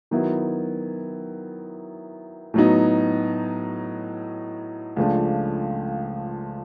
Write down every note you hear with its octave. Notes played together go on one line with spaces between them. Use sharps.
D#3 F#3 B3 E4
A2 F#3 B3 D#4
C#2 C#3 F3 A3 D4